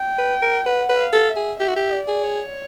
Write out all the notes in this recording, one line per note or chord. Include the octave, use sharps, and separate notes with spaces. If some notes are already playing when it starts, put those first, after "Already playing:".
Already playing: G5
B4
A#4
B4 F#5
B4
F5
A4
E5
G#4
G4 E5
F#4
G4
D5
G#4
C#5